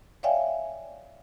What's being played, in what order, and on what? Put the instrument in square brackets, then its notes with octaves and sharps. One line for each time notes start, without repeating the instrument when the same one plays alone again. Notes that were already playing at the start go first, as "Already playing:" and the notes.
[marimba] C#5 D5 E5 F5 G5 G#5